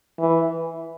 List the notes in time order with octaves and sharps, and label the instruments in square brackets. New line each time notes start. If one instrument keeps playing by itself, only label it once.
[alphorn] E3